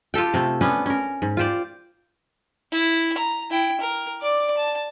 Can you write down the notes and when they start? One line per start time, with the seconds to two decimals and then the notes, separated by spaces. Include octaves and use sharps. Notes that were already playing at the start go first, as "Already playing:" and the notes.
0.14 F4 G4 A4 G5
0.34 C3 A3
0.61 B3 C#4 D4
0.86 C#4 A#4
1.22 G#2
1.37 F4 G4 C5 D5
2.72 E4
3.18 A#5
3.51 E4 G5
3.81 A#4
4.22 D5 D6
4.57 A5